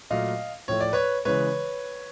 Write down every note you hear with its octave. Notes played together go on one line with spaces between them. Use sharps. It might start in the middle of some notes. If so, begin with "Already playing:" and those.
A#2 F#3 A3 D#5 F5
A2 F3 A3 C#5
D5
B4 C#5
C#3 E3 G#3 B4 C#5